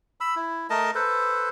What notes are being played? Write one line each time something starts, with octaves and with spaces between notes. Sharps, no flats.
B5 E6
E4
A3 A#4 D#5 A5
A4 B4 C5